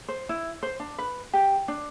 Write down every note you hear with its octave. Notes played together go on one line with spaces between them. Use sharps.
C5
E4
C5
D4
B4
G4
D4